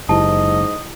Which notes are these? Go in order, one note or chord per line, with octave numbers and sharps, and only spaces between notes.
F#1 G#2 E4 G4 D#5 A5